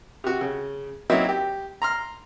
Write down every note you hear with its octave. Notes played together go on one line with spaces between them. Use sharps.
C3 F#4
C#3
F#3 A#3 C4 D#4 E4 F#4
G4
A#5 C6 F6